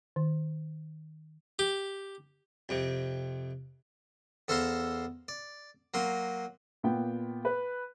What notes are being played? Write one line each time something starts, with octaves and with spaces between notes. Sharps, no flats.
D#3
G4
F2 C3
E2 A4 C5 F5 A#5 C6
D5
F#3 A#3 C6
A#2 B3 G5
B4